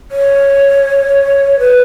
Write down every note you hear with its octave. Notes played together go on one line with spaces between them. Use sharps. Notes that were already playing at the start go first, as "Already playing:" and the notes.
C#5
B4